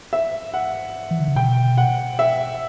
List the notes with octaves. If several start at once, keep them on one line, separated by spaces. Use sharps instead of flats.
E5
F#5
E3
D3
C#3
B2 G5
F#5
E5